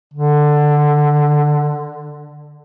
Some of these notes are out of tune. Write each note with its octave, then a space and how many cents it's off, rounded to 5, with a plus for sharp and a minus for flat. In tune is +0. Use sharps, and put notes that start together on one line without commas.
D3 +10